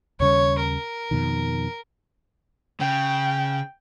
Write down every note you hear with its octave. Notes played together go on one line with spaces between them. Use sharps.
D#2 C#3 G3 C#5
A#4
F2 B2 D#3
C#3 G5